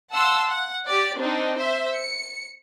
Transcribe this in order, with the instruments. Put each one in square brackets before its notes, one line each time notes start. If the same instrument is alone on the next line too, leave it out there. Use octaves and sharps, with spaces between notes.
[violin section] F5 F#5 A5 C6 E6
F#5
G4 D5
C4 D4 D#4
C5 E5
C#7